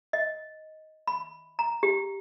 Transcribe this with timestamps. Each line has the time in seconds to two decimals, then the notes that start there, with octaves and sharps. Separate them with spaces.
0.13 D#5
1.07 B5
1.59 A#5
1.83 G4